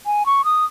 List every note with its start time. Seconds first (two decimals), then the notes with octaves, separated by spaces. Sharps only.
0.06 G#5
0.26 C#6
0.45 D#6